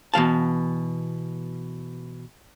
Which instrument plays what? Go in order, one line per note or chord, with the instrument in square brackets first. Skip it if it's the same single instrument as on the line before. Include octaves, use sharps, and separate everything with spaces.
[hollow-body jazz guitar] B2 E3 F5 A5